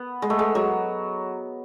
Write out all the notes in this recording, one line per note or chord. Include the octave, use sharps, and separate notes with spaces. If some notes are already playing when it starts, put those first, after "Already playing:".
Already playing: B3
G#3
A3
G#3
F#3